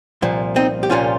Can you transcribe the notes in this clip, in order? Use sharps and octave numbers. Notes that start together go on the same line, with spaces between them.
C2 A#2 F3
C4 D#4
G4
C2 A#2 F3 C#4 F4